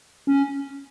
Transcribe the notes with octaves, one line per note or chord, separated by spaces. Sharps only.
C#4